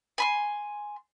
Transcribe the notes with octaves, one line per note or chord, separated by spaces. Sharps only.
G#5 B5 C6